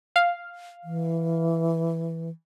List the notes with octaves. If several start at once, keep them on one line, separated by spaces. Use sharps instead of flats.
F5
E3